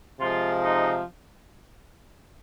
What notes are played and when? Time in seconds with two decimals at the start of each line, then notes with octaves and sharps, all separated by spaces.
0.20 C3 F3 G#3 F4
0.61 D#4